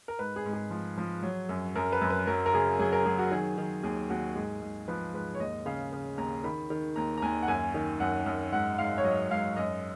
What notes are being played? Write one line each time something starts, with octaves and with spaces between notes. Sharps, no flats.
A#4
G#2 B4
G#4
G#2
G#4
F3
F3
F#3
F#2
F#2 A#4
B4
F#2
B4
F#3 A#4
A#4
C#3 G#4
F#3 G#4
A#4
F#3 G#4
F#4
D#3 G#4
D#3
D#2 G#4
D#2 F#4
G#2 G#4
G#2
F3 B4
G#2 B4
C#5
D#2 D#5
C#3 F5
C#3
D#2 A#5
D#3 B5
D#3
D#2 A#5
A#5
D#2 G#5
F#5
F#2 G#5
D#3
F#2 F#5
F#2
G#2 F#5
G#2 F5
C#5
F#3 D#5
G#2 F5
F#2 D#5